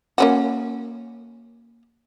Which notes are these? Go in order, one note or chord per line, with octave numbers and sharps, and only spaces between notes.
A#3 C#4 F#4